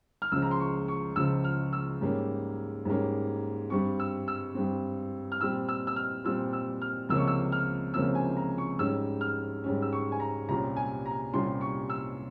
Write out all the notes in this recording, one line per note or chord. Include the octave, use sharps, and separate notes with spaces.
F6
C#2 C#3 F3 E6
A#5
C6
C#6
C#6
C#2 C#3 F3 E6
F6
E6
G#2 G3 A#3 C#4
G#2 G3 A#3 C#4
G2 G3 C4 C#6
E6
E6
G2 G3 C4
F6
A#2 G3 C4 E6
E6
E6
F6
A#2 G3 C4 E6
E6
F6
C#2 C3 F3 A#3 C#4 E6
C#6
E6
F6
C#2 C3 F3 A#3 C#4 E6
G#5
A#5
C#6
G#2 G3 C#4 E6
F6
G#2 G3 C#4
E6
C#6
G#5
A#5
C2 A#2 G3 C#4 A#5
G#5
A#5
C2 A#2 G3 C#4 C6
C#6
E6